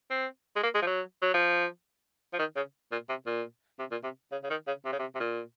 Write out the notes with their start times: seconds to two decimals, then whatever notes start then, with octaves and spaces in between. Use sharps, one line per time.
0.10 C4
0.56 G#3
0.63 A#3
0.75 G#3
0.82 F3
0.87 F#3
1.22 F#3
1.34 F3
2.33 F3
2.39 D#3
2.56 C#3
2.92 A#2
3.09 C3
3.26 A#2
3.79 C3
3.91 A#2
4.03 C3
4.32 C#3
4.44 C#3
4.50 D#3
4.67 C#3
4.85 C3
4.92 C#3
4.99 C3
5.15 C3
5.20 A#2